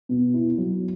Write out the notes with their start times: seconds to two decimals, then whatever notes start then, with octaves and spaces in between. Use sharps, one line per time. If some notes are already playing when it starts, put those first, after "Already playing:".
0.09 B2
0.34 E4
0.58 F#3